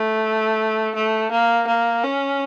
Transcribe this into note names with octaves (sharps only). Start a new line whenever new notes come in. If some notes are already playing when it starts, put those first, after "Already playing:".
Already playing: A3
A3
A#3
A#3
C#4